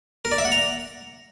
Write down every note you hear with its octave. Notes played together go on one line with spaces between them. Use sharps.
A#4
D5
E5
F#5
A#5